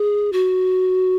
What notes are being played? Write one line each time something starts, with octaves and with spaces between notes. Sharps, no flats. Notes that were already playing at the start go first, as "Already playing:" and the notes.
Already playing: G#4
F#4